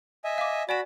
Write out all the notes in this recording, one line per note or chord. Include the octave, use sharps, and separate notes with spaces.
D#5 E5 G#5
F5 D6
F#4 D5 G#5 B5 E7